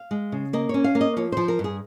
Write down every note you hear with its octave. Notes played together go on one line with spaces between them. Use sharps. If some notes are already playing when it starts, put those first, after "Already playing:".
Already playing: F5
G#3
C#3
A#3 D#5
C#4 C#5
F5
A#3
D#5
F3 C#5
F3 C5
A#4
G2
G#4